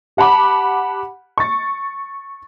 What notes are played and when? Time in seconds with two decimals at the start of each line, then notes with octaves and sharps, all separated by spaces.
0.17 G4 F#5 A5 B5 D6
1.38 C#6 A6